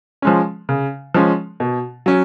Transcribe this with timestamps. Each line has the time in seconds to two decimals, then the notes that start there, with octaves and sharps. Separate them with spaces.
0.22 F3 G#3 C#4
0.69 C#3
1.14 F3 G#3 C#4
1.60 B2
2.06 F#3 C#4